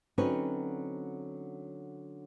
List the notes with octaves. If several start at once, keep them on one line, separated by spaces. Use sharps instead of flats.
D3 F#3 C4 C#4 D#4 B4